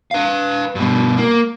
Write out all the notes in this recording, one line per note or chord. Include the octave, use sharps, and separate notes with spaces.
B4 F5
G2 B2
A#3